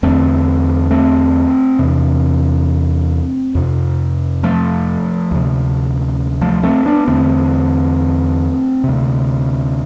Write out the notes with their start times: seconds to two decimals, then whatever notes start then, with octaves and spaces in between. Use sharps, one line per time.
0.03 E2 D3 A3 C4
0.91 A3 C4
1.79 E2 C3
3.55 F2 C3
4.43 F3 A3
5.31 D2 C3
6.41 F3 A3
6.63 A3 C4
6.85 B3 D4
7.07 E2 D3 A3 C4
8.84 D2 C3